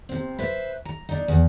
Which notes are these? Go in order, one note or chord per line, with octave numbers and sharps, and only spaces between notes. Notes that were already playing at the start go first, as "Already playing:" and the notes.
C3 C4
B4 C5 E5
A#5
D4 D#4
E2